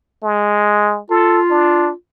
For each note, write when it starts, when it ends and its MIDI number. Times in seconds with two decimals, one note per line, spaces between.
0.23 1.01 56
1.10 1.92 65
1.10 1.40 69
1.51 1.91 62